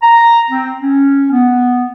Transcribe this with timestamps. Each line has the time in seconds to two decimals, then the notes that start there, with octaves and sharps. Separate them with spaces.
0.02 A#5
0.50 C4
0.81 C#4
1.31 B3